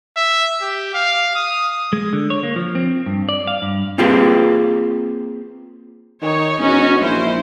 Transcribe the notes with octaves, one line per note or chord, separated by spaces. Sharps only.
E5
G4
F5
D#6
G#3
D3
C#5
A#3
F3
C4
G2
D5
F5
G2
A#3 C4 F4 G4 G#4 B4
D#3 D#4 C#5
E1 C#4 F#4
A#1 E4 C5